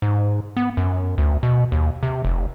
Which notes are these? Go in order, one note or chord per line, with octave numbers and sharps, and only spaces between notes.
G#2
B3
F#2
D2
B2
D#2
C3
F1